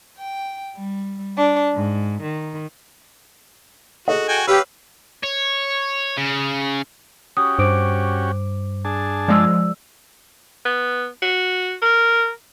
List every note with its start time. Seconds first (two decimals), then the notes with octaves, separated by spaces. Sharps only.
0.17 G5
0.76 G3
1.36 D4
1.74 G#2
2.22 D#3
4.08 F#4 G#4 A4 D#5
4.28 F#4 G5 G#5
4.48 G4 B4 C#5 F5 E6
5.24 C#5
6.17 C#3
7.37 C#4 F#4 G4 D#6
7.59 G2 C5 D6 D7
8.85 D4 G#4 A5
9.28 F3 G#3 D5 E6
10.65 B3
11.22 F#4
11.82 A#4